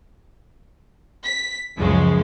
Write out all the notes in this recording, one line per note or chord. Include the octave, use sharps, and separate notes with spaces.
B6
C#2 F#2 C#3 F3 G#3